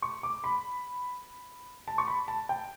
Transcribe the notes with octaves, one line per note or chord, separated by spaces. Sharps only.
C#6
D6
B5
A5
C#6
B5
A5
G5